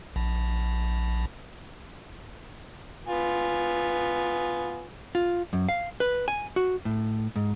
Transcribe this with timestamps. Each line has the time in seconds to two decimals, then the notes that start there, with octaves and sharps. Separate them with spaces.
0.16 A#1
3.07 B3 F4 G#5
5.15 F4
5.53 F#2
5.69 F5
6.00 B4
6.28 G#5
6.56 F#4
6.85 A2
7.36 G#2